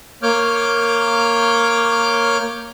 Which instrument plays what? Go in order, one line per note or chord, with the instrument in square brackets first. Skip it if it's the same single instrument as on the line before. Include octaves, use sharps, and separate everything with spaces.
[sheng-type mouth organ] A#3 C#5 D6 F6 G6